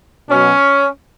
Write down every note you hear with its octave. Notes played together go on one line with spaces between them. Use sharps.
B2 F#3 C#4